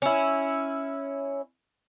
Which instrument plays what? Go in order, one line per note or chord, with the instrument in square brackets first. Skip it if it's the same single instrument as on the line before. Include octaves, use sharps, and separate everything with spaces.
[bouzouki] C#4 E4